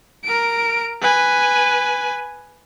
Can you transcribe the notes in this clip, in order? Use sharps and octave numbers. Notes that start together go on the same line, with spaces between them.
A#4 D7
B4 G#5